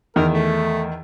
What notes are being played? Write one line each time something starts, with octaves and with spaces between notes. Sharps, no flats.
E2 D#3 A#4
A3